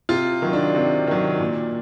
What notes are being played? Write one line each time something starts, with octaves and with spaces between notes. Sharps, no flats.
C3 F4
D#3 F#3
D4
C3
D#3 F#3
A#2